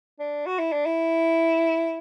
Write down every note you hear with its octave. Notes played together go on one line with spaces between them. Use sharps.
D4
F#4
E4
D4
E4